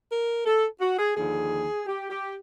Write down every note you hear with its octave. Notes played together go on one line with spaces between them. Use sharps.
A#4
A4
F#4
G#4
D#2 D3 F3 G#4
G4
G4